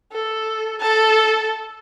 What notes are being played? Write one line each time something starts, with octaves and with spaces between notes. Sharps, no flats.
A4
A4 A5